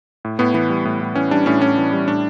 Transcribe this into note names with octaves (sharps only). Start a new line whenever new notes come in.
A2
A2 B3
E3 B3
G3
A2
A2
E3 C#4
G3 D4
A2 C#4
A2 C#4
E3
G3
A2 D4